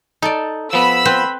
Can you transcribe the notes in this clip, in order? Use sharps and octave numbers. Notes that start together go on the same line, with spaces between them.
D#4 A4 D5
F3 B3 B5 E6
C4 B4 C5